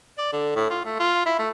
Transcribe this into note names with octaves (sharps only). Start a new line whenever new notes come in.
D5
D3
A2
F4
A3
F4
E4
A3